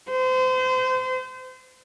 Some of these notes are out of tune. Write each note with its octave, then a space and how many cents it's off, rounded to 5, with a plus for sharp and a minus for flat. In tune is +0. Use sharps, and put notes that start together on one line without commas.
C5 -30